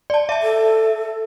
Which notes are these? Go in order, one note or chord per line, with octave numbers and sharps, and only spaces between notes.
D5 A5
E5 A5
A4